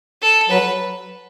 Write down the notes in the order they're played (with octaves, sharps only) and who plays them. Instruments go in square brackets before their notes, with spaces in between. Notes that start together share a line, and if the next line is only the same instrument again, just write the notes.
[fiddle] A4
[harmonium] F#3 [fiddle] B4